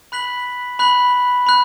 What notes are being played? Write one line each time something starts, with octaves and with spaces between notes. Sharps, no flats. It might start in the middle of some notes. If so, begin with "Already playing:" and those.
B5 F#6 B6 F#7
B5 F#6 B6 F#7
B5 F#6